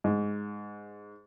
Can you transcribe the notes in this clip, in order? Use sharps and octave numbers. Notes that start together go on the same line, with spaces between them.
G#2